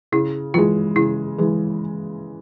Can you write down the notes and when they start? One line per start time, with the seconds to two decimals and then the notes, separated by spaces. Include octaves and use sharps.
0.12 C#3 E4
0.54 E3 G#3 F4
0.96 C#3 E4
1.38 E3 G#3